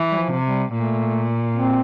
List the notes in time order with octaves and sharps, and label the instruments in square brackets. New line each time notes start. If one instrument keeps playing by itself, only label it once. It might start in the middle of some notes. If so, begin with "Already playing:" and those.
Already playing: [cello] E3
[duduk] G3
F3
[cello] C3
[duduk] G3
[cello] A#2 [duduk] A3
[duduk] C4